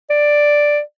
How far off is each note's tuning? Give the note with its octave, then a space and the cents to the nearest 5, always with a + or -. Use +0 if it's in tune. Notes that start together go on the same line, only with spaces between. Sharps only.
D5 +5